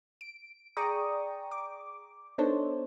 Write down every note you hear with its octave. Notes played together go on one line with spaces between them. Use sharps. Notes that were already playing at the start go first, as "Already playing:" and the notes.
D7
G#4 D5 G5 A#5 C#6 D#6
D6
B3 D4 D#4 A4 C5 C#5